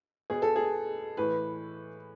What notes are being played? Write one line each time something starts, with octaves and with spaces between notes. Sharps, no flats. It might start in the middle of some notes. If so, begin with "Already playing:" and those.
B2 G#4
A4
G#4
A2 E3 B4